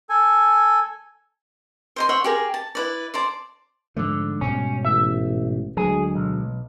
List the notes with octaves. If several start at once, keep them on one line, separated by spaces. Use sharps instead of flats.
A4 G#5
C5 D#5 C6
C5 C#5 E5 F#5
G4 G#4 A#4
A5
E4 B4 D5
C5 D5 A5
G#2 D3 F3 A3
G#2 B2 G3 C#4
A1 E5
D2 F#3 G#3 G#4
B1